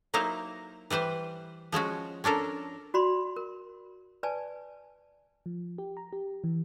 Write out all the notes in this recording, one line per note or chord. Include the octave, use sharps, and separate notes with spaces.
F#3 A#3 D#4 E4 C5 F5
E3 G3 B4 C5
F3 G#3 C#4 F#4
C#4 D4 A4 A#4
F#4 D5 B5 C6
A#4
B4 D5 G#5 A5
F3
G4
A#5
G4
E3